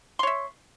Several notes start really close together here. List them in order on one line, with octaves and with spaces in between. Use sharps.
C6 C#5 E5